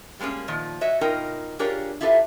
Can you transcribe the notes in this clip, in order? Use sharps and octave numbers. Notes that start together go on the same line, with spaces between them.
G3 G#3 A#3 C#4 G#4
A#2 D#3 F3
F#4 C#5 D#5 E5
B2 D#4 F4 A#4 D#5 G5
D4 F4 G4 G#4 A#4 C#5
E4 F4 G4 A4 B4